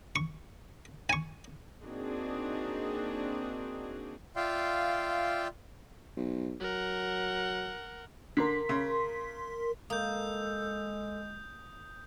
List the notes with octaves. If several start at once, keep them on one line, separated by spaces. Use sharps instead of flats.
C#6
G#5 C#6
A#3 C4 D4 D#4 F#4 G#4
F4 D5 E5 F5 G5 C6
B1
F#3 A#4 F#5
D3 A#4 C6 B6
C#3
G#3 A#3 A4 D#6 G6